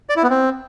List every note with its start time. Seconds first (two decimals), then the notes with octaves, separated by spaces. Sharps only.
0.09 D5
0.16 E4
0.23 B3
0.30 C4